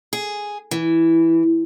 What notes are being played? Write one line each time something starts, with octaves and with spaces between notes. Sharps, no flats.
G#4
E3